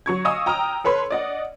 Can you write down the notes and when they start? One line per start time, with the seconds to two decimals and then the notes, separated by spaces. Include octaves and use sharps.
0.06 F#3 C#6 G#6
0.25 D#5 F5 G#5 C#6 D#6 E6
0.46 G5 A#5 D#6 F6
0.84 A4 B4 C#5 B5 C6
1.11 D5 D#5 F#5